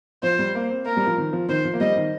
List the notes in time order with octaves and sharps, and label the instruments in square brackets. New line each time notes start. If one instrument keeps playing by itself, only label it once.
[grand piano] F3 [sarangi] C5
[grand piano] G3
A#3
C4
[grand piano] A#3 [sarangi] A#4
[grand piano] G3
F3
D#3
F3
[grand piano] D#3 [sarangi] C5
[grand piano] F3
A#3
[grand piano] G3 [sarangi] D#5
[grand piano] D#3